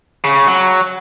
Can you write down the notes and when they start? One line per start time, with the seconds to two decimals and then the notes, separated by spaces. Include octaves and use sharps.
0.24 C#3
0.47 F#3